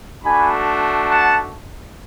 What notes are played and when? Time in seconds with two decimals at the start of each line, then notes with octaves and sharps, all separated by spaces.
0.23 A3 D4 F#4 G#5 B5
1.09 F#5 A5